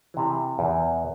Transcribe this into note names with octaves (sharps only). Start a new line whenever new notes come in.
C3 E3
E2